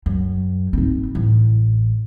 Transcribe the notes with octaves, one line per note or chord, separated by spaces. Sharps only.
F#2
G#2 C4
A1